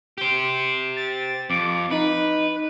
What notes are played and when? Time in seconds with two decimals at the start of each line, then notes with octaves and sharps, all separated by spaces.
0.18 G4 C5
0.96 A6
1.50 F2 D6
1.91 D#4 B4